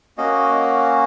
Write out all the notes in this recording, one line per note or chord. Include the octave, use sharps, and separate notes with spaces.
A#3 C#4 F#4 D#5